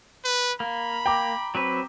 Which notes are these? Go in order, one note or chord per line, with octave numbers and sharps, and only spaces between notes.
B4
A#3 B5
G5 A#5 D6
F#3 C4 B4